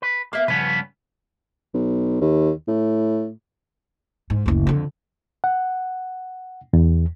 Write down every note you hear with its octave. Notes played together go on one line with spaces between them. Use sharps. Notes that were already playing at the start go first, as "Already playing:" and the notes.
B4
A#3 B3 E5 F5
G2 C#3 F3 B3 C#4 B4
B1
D#2
A2
G#2
F#1 D2
F2 D3
F#5
E2